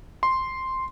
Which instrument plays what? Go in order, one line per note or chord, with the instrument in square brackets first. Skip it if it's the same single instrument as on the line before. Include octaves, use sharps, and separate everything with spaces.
[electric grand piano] C6